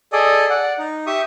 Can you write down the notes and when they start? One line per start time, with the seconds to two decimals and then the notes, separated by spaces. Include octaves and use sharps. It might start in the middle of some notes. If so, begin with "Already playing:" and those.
0.13 G#4 A4 D5 D#5
0.50 D5 F#5
0.79 D#4
1.07 G4 E5 C#6 D#6